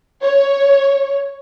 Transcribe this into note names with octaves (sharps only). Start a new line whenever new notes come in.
C#5